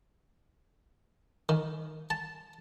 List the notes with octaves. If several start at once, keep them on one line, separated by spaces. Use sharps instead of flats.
D#3
A5